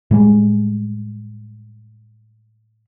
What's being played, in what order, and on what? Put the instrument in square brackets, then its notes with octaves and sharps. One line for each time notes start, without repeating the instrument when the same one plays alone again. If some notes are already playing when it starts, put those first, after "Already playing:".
[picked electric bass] A2 G3 G#3